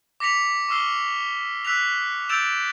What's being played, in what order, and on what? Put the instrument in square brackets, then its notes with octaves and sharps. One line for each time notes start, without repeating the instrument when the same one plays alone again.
[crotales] D6 A#6 B6 C#7 F7
C#6 D6 E6 F6 C7 G7
E6 F#6 B6 F7
E6 G6 A6 D7 E7 F7